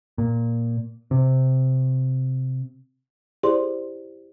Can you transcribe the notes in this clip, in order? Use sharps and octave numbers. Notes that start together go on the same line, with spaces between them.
A#2
C3
E4 G4 G#4 C5 D5 C6